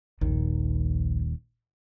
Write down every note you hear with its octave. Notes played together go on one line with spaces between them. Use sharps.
D#1 A#1 D#2 D#3